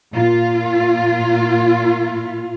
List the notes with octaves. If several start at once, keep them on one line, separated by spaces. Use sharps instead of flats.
A#2 F4